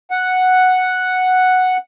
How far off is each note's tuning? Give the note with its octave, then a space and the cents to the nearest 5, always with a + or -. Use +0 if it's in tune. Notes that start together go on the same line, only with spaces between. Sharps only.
F#5 +0